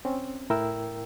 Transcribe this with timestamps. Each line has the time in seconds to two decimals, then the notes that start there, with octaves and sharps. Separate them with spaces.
0.05 C4 C#4
0.50 A2 E4 A#4 G5 E6